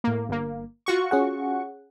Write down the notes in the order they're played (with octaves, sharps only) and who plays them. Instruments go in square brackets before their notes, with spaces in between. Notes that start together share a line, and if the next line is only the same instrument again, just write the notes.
[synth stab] A2 A#3
G1 A#3
F4 F#4 C#6
[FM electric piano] C#4 G#4 F#5